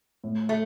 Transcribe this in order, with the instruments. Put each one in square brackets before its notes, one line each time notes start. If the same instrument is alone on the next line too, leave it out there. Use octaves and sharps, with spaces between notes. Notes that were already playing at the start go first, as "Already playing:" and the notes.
[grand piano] A2
[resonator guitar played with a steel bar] A3